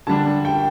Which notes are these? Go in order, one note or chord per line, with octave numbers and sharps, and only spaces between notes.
D3 G3 D4 A5
G5